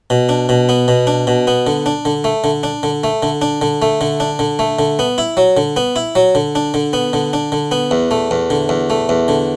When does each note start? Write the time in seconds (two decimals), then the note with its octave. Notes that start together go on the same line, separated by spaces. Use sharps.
0.10 B2
0.29 D4
0.49 B2
0.69 B3
0.88 B2
1.07 D4
1.27 B2
1.47 B3
1.67 D3
1.86 D4
2.05 D3
2.24 A3
2.44 D3
2.63 D4
2.83 D3
3.04 A3
3.23 D3
3.42 D4
3.62 D3
3.82 A3
4.01 D3
4.20 D4
4.39 D3
4.59 A3
4.79 D3
4.99 B3
5.18 E4
5.37 F#3
5.57 D3
5.76 B3
5.96 E4
6.15 F#3
6.35 D3
6.55 D4
6.74 D3
6.93 B3
7.13 D3
7.33 D4
7.52 D3
7.71 B3
7.91 E2
8.11 A3
8.31 E2
8.50 D3
8.69 E2
8.90 A3
9.09 E2
9.28 D3